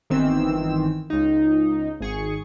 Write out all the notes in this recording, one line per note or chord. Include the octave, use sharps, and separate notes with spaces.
G1 D#3 E3 C4 E6
C#2 D#4
G#1 G#4 C#6